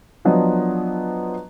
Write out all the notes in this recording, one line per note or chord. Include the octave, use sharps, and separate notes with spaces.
F3 F#3 B3 D4 F4 D#5